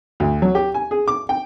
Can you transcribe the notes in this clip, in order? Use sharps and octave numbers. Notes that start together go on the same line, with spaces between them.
D2
F#3
G4
G#5
G#4
D6
G5